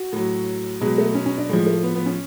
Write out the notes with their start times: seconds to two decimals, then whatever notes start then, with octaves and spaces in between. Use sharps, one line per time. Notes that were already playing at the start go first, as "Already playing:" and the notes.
Already playing: F#4
0.13 A2 F#3
0.81 B2 F#3 G#3
0.98 A3
1.15 C#4
1.26 C#4
1.38 D4
1.49 A2 F3 G#3
1.66 A3
1.83 B3
1.95 B3
2.06 C#4